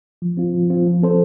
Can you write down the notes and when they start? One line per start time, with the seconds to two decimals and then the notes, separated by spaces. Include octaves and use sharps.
0.22 F3
0.37 C4 F4
0.54 F3
0.70 C4 F4
0.87 F3
1.03 C4 A4 C5